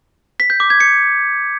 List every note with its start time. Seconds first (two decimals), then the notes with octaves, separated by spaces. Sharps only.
0.40 B6
0.50 G6
0.60 D6
0.70 G#6
0.80 C#7